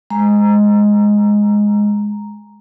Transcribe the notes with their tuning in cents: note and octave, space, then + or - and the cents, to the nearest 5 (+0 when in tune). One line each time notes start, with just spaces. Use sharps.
G#3 +0 A#5 +0